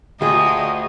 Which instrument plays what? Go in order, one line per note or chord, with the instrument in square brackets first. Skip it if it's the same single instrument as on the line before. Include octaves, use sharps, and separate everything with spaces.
[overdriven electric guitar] D2 [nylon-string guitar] F4 G4 G#4 [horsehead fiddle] D#5